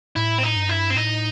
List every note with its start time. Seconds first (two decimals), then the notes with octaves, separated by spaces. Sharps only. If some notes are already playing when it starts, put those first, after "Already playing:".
0.16 A2 E4
0.38 C4
0.43 D#4
0.56 G2
0.69 E4
0.90 C4
0.96 A2 D#4